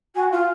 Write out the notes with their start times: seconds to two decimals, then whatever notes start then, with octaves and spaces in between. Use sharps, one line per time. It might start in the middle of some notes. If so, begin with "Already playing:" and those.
0.15 F#4 G#5
0.24 F#5
0.32 F4 F5